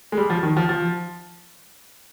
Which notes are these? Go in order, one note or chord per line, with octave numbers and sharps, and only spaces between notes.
G#3
G3
F3
D#3
F3
F3